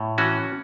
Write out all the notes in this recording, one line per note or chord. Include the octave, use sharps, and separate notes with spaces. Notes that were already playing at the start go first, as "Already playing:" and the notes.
Already playing: A2
E3 C#4 F#4